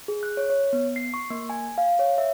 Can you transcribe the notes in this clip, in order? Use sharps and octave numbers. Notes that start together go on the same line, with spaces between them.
G#4
F#6
C#5
C#5
B3
C7
C#6
A#3
G#5
F5
C#5
E5